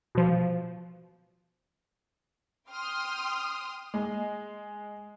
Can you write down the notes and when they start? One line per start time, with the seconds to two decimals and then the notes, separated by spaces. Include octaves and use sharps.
0.15 B2 F3
2.71 G5 C6 D#6 F6
3.94 G#3